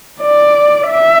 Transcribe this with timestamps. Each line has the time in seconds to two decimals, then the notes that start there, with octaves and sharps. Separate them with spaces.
0.22 D5
0.88 E5